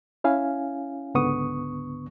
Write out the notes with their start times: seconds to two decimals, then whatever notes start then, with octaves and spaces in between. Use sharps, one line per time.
0.24 C#4 E4 F5 G#5
1.14 C#2 G#2 D3 B3 C#6 D#6